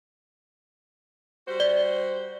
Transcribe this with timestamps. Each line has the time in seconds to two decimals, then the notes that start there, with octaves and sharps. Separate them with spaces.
1.48 G3 F#4 C5
1.60 D5 G7